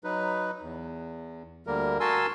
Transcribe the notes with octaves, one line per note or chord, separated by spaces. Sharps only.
F#3 D#4 B4
E2
D2 D3 G3 A#3 A#4
F#4 A#4 G#5 A5 C6 E6